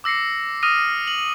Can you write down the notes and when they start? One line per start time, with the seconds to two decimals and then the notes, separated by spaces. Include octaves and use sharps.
0.04 D6 E6 A#6 C7 C#7
0.63 D#6 F6 A#6 D#7
1.07 F#7